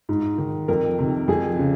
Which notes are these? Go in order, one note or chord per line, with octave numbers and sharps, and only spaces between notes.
G#2
D#3
F2 A#4
C3 D#3
F2 G#4
C#3